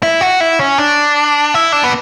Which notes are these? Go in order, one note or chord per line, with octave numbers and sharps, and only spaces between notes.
E4
F#4
E4
C#4
D4
E4
D4
B3